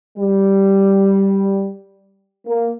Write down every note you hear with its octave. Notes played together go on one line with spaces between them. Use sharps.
G3
A#3